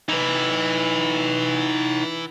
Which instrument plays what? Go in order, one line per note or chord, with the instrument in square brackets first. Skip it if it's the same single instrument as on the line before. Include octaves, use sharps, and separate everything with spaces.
[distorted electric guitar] E3 [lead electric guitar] D#4 B4